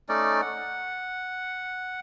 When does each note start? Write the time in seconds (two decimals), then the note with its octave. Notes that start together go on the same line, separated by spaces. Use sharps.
0.09 A3 C#4 D#4 D5
0.42 F#5